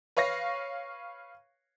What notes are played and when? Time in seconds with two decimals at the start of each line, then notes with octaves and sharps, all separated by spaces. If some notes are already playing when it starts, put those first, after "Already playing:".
0.17 B4 C#5 F5 C#6 A#6